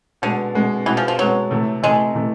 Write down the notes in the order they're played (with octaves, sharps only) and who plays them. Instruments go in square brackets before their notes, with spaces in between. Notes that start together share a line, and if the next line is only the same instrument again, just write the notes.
[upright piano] B2 G#3 B3 [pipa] D3
[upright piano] B2 G#3 B3
[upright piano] B2 G#3 B3 [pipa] E3
[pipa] F3
F3
[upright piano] B2 G#3 B3 [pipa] F#3
[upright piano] C3 E3 A3
[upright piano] C3 E3 A3 [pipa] G#3
[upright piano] C3 E3 A3